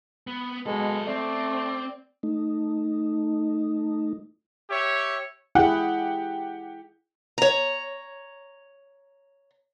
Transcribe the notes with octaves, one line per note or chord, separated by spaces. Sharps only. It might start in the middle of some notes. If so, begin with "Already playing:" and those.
B3
B2 F#3 G#3 A4
A3 C4 D5
A3 D#4
G4 C#5 E5
E4 G4 G#4 F#5
C#5 A#5